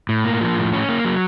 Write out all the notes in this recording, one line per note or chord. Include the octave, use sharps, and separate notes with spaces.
A2
A#3
F3
A2
C#4
A#3
F#3